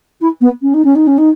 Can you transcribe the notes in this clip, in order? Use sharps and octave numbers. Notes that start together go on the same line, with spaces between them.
E4
B3
C#4
D#4
C#4
D#4
C#4
D#4